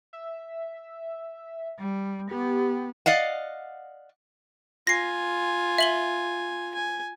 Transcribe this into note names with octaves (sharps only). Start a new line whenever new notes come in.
E5
G3
B3 G4
D5 D#5 F5 F#5
F4 G#5 A#6 C7
E5 F#7 G7
G#5